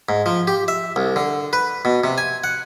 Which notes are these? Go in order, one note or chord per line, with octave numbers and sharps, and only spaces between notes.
G#2
F3
G4
E5
C2
D3
B4
B2
C3
G#5
F#5